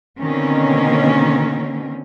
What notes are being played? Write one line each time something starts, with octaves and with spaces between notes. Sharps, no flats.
B2 D3 D#3 A#3 C4 C#4